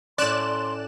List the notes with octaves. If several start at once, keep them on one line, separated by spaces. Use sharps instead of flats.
A2 C#4 D5 C6 F#6 E7